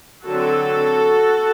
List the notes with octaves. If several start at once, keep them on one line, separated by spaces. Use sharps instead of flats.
D3 F#3 C4 F#4 A4